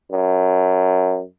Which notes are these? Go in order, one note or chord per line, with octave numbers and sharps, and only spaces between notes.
F#2